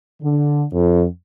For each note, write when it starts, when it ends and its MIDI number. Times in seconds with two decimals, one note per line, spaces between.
0.21 0.63 50
0.72 1.04 41